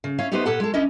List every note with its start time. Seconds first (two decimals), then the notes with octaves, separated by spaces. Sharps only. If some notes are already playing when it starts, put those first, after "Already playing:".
0.04 C#3
0.18 C#4 E4 C#5 F5
0.32 A3 B3 D#4 G4 B4 C5
0.45 A#2 G4 A4 B4 F#5
0.60 G#3 A4
0.74 C#4 D4 E4 D#5